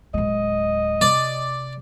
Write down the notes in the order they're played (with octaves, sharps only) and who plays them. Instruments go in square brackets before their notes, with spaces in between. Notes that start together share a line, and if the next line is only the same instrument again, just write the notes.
[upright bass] D1 G#3 [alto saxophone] D#5
[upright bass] C3 [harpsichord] D5